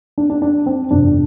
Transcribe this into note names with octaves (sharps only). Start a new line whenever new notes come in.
D4
D4
D4
C4
G1 F2 C3 F3 D4